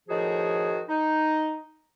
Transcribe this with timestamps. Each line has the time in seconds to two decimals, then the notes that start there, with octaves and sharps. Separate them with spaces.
0.09 A2 D#3 F3 F#4 G#4
0.89 D#4